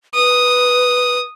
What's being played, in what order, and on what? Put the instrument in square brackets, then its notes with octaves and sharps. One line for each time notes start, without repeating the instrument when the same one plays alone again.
[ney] B4 [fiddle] D#6